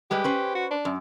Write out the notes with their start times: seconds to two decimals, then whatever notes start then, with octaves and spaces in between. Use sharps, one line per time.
0.11 G3 G#3 G4 B4
0.24 C#4 B4 C5
0.55 F#4
0.71 D4
0.85 F#2